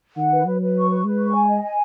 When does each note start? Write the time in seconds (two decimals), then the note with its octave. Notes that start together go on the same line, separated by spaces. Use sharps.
0.17 D#3 F#5
0.32 B4
0.46 F#3 B4
0.60 B4
0.75 C#6
0.90 B4
1.04 G#3 B4
1.19 C#6
1.33 G#5
1.48 D#5
1.63 G#5